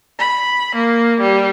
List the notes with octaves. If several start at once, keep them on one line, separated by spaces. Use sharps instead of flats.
B5
A#3
G3